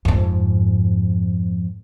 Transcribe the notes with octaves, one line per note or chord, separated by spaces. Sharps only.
F2 G#2